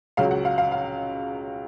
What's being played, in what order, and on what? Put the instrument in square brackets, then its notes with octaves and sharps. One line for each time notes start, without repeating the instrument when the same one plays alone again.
[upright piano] C#2 C#3 F#3 F5
F#5
F5
F5
F5